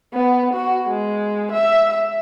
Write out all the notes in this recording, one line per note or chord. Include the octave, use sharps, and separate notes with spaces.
B3
F#4
G#3
E5
E5